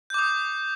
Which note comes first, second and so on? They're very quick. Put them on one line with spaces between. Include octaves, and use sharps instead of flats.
G6 D6 D#6